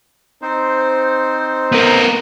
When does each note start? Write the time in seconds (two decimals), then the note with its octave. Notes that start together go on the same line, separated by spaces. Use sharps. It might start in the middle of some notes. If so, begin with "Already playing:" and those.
0.42 C4 D#4 C5
1.72 B3 A#4